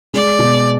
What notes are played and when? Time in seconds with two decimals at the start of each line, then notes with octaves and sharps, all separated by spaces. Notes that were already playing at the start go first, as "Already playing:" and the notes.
0.14 G#3 D5
0.39 B2